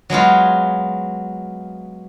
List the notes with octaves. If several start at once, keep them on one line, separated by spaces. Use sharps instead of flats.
F#3 G#3 B3 F4